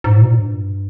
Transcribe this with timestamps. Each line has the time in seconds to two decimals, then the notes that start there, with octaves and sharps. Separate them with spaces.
0.04 G#2
0.16 A2
0.21 B2
0.27 A#2
0.38 G2